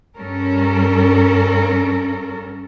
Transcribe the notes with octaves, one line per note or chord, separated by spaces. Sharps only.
G2 G3 C#4 A4 A#4